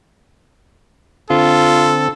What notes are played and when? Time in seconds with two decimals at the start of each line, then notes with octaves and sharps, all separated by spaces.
1.30 D3 C4 F4 A4